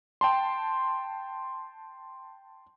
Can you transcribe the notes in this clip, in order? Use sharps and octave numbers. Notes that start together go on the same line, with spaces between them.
G5 A5 C6